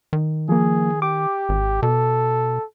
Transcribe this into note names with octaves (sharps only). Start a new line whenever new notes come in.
D#3
F3 A#3 G#4
G4 D6
G#1
B2 A4